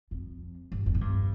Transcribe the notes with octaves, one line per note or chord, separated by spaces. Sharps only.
F2
G2
F2
A2
G2